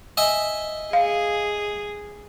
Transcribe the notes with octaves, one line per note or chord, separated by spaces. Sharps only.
D#5 E5 G#5
G#4 F5